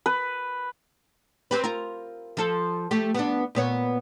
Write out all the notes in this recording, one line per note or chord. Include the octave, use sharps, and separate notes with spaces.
B4
C4 G4 B4
F4 A#4
F3 A4
A3 G4
B3 D4
A#2 B3 C#5